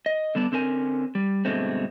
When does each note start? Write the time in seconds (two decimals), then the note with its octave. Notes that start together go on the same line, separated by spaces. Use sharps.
0.06 D#5
0.35 D3 G3 B3 D4
0.52 D3 C4 C#4 A#4 G#5
1.15 G3
1.45 G2 B2 D3 G#3 A3 C4